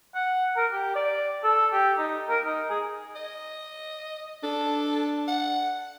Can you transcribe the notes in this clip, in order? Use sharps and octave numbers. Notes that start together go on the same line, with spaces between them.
F#5
A#4
G4
D5
A4
G4
D#4
A#4
D#4
G#4
D#5
D4 A4
F#5